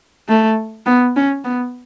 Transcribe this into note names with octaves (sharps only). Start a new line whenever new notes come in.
A3
B3
C#4
B3